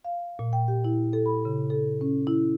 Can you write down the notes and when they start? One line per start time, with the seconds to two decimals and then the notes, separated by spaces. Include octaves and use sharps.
0.05 F5
0.39 A#2
0.53 G5
0.68 G4
0.85 E4
1.13 A4
1.26 B5
1.45 C#3
1.70 A4
2.01 C#4
2.27 E4